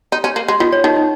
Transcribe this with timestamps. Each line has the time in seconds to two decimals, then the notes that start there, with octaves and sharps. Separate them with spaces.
0.12 D#4
0.24 C#4
0.36 A#3
0.48 G#3
0.60 D#3 F4
0.72 C#5
0.84 D#3 D#4
0.96 D#4